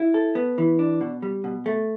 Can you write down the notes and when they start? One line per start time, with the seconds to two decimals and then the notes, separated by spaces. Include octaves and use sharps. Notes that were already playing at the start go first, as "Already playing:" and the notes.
Already playing: E4
0.14 A4
0.35 B3
0.58 E3
0.79 D4
1.01 B2
1.22 G3
1.44 B2
1.66 A3